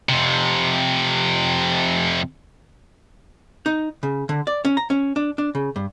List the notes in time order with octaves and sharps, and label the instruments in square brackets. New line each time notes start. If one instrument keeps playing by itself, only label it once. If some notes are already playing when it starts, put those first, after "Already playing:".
[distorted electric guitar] F2 C3
[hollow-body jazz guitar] D#4
C#3
D3
D5
C#4
A#5
C#4
D4
D4
C#3
G2